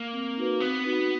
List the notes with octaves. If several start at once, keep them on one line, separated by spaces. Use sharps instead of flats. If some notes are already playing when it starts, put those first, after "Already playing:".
Already playing: A#3
C4
D#4 F#4 B4
B3 C4
D#4 F#4 B4